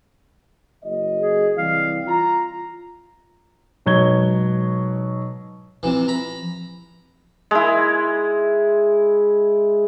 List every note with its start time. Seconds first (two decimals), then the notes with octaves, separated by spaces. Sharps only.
0.84 F#1 D#5
1.19 G#4
1.57 C3 E3 G3 F5
2.06 F4 A#5
3.86 G#2 B2 F#3 C#6 G#6 G7
5.83 C3 E3 F3
6.08 A#5 B5
7.51 G#3 E4